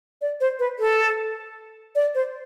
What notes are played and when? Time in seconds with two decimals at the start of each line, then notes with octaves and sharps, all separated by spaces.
0.21 D5
0.40 C5
0.59 B4
0.79 A4
1.95 D5
2.15 C5